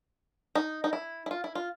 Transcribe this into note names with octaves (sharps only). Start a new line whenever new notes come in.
D#4
D#4
E4
E4
F4
E4
F4